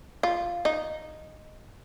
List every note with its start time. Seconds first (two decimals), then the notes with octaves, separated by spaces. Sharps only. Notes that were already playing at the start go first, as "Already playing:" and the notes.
0.23 F4
0.65 D#4